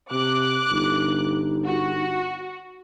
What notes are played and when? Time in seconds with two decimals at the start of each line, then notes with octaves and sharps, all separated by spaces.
0.11 C3 D6 F#6
0.71 G1 D#4
1.65 F#4